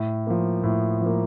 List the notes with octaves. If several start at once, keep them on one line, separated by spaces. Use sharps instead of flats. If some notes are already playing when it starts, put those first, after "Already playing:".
Already playing: A2
F3 A#3
A2
F3 A#3